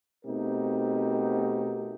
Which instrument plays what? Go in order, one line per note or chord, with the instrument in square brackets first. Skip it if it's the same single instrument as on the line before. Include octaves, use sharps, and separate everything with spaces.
[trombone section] B2 A3 C4 D#4 G4 A#4